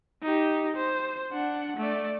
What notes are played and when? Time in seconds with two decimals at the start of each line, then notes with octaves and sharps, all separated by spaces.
0.23 D#4 G4
0.76 C5
1.32 D4 F#5
1.77 A3 D5